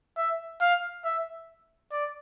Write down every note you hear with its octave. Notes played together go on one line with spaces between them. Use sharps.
E5
F5
E5
D5